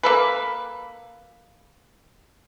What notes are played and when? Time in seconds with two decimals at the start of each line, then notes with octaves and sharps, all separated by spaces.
0.03 A#3 A4 B4